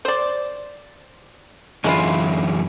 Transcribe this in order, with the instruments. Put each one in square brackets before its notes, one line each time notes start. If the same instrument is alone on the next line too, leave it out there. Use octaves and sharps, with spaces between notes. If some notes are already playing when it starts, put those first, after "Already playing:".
[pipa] C5 D5
[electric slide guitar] F#2 D3 E3 [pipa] G#3 E4 F4